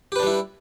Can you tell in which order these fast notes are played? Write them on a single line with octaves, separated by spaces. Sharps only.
G4 B4 D4 G3 E4